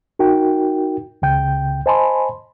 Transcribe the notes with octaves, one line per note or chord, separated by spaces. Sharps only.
D#4 F#4 A#4 G5
C#2 C#3 G5 G6
C5 D#5 G#5 A5 B5 C6